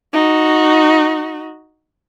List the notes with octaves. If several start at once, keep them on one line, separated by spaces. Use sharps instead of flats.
D#4 F#4